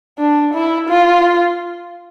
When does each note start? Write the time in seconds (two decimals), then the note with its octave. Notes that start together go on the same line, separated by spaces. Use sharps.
0.19 D4
0.53 E4
0.89 F4